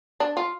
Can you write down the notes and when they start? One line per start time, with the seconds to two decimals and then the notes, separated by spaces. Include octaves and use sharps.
0.20 D4
0.37 F4